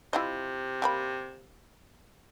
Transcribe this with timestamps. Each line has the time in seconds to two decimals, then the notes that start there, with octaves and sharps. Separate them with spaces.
0.13 C3 E4 F4 D#5
0.82 G3 A#3 B5